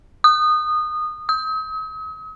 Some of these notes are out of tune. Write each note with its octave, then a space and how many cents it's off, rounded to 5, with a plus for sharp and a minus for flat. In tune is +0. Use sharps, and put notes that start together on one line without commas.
D#6 -20
D#6 +45